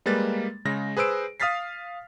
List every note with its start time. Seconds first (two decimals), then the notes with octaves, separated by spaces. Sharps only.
0.06 G3 G#3 A#3 B4 A6
0.65 C#3 G#3 A#6
0.97 G#4 B4 C5 E6 D7
1.40 F5 D#6 F6 A6 B6 C7